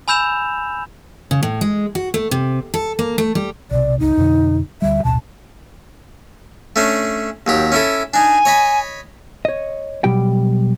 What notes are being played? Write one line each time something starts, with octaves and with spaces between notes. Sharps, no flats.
G#5 B5 E6 G6 E7 F7
C#3
A2
G#3
F#4
A3
C3
A4
A#3
A3
G3
B1 C3 D5
G1 C#2 D#4
F2 B2 D3
D2 G3 E5
A1 D2 B2 A5
A3 C#4 D4
D#2 F#3 G4
C#4 E4 A4
D4 D#4 G#5
C#5 D#5 B5
C#5 D#5
B2 F#3 G3 G4 G5